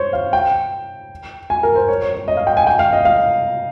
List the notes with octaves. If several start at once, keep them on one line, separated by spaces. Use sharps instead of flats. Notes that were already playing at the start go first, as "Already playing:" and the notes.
Already playing: C5 C#5
F5
G5
G#5
A#4
C5
C#5
C#5
C#5
D#5
F5
G5
G#5
G5
F5
D#5
F5